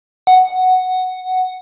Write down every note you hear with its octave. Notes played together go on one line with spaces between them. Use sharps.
F#5